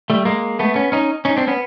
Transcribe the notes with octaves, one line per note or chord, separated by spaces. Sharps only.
G3 A3
G#3 A#3
A3 B3
B3 C#4
C#4 D#4
C#4 D#4
C4 D4
B3 C#4